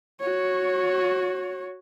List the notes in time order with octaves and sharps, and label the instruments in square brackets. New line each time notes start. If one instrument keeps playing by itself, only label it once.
[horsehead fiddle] F#4 C#5